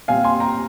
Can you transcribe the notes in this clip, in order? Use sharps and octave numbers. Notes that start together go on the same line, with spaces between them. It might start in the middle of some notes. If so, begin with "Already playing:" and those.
A#2 G3 C4 F5 G#5
G#5 C6
G5 A#5